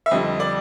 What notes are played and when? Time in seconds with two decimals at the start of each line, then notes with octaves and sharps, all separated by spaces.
0.06 E5
0.11 F2 D3 G3 D#5
0.40 D5